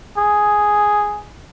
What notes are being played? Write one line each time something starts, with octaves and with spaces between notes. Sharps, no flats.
G#4